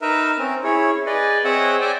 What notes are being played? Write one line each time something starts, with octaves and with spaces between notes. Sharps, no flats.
D#4 A#4 B4 E5
C4 C#4
C#4 E4 G#4 C#5
G#4 B4 D5 D#5
C4 G#4 C#5 D#5 E5 F#5
D5 E5 G5 G#5